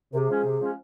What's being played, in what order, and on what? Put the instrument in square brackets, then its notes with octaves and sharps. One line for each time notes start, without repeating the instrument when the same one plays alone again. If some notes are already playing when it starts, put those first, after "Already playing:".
[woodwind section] C3 [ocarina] G#4 A#4
[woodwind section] F3 G#3 C#4
C3
F3 G#3 C#4